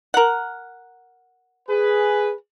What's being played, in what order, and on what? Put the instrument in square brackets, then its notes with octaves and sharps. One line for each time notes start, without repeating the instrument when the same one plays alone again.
[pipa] A#4 F#5
[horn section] G#4 B4